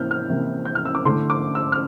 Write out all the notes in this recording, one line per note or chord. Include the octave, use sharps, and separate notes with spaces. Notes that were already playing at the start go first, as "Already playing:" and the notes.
Already playing: C3 E3 A#3 F6 G6
F6
C3 E3 A#3 E4
G6
F6
E6
D6
D3 A3 E4 C6
D6
E6
F6